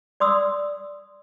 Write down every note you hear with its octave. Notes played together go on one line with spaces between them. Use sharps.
D5 C6 D#6 E6